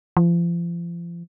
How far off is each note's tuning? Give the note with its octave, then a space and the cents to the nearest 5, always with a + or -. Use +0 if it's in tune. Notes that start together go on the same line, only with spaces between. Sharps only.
F3 -35